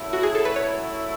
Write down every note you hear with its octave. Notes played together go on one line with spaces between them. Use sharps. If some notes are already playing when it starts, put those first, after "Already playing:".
Already playing: C#3 F#3 A3 E4
F#4
G#4
A4
B4
C#5